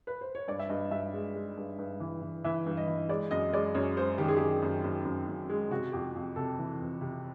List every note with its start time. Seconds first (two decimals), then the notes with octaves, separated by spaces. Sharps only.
0.07 B4
0.21 C5
0.35 C#5
0.48 G2 D5
0.59 E5
0.69 G2 D#5
0.91 G2 E5
1.14 G#3
1.36 G#3
1.57 G2
1.79 G2
2.00 E3
2.22 E3
2.44 E3 E5
2.66 G2
2.77 D#5
2.88 E3
3.09 G#3 D5
3.31 F#2 D#5
3.53 G#3 D5
3.74 F#2 C#5
3.97 G#3 C5
4.18 D#3 G4
4.28 G#4
4.37 F#2 G4
4.62 F#2
4.84 F#2
5.05 F#2
5.27 F#2
5.49 G#3
5.70 C3 F#4
5.92 F2 G4
6.15 F2
6.36 C3 A4
6.59 E3
6.80 F2
7.01 C3